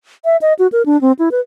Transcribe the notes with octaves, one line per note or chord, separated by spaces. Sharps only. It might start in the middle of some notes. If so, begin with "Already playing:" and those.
E5
D#5
F#4
A#4
D4
C4
E4
B4